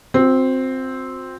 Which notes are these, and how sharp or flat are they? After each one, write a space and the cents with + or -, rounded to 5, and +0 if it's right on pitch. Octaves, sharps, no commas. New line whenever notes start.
C4 +0 F#4 -45